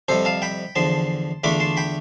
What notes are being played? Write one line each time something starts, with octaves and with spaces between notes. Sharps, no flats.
F2 C3 G3 A4 C5
F5 A5
G5 B5
E2 D3 F3 A5 C6
E2 D3 A3 D4 F4 B5 D6
A5 C6
G5 B5